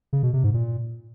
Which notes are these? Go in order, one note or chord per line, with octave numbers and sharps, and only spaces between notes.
C#3
B2
C3
G#2
A#2